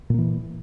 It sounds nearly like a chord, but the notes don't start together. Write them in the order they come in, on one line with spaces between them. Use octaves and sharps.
A#2 A#3 E3